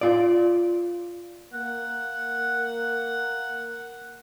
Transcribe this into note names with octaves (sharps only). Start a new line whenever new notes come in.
F4 D5
A#3 F#5